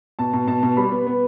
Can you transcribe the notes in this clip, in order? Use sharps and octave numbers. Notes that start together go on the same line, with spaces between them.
B2 A5
B2
B2 A5
B2
G3 B5
B3
B3